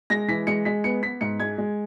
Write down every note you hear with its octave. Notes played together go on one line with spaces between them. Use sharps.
G#3 A#6
E3 B6
G#3 C#7
G#3 B6
B3 C#7
B3 B6
G#2 C#7
G#3 G#6
G#3